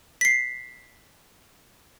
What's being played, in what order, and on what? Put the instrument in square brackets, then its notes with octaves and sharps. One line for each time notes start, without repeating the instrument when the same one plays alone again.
[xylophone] B6 C7